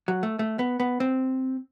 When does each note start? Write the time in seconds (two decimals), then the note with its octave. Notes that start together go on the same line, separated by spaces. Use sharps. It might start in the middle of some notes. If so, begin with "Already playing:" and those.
0.08 F#3
0.23 A3
0.39 A3
0.59 B3
0.80 B3
1.00 C4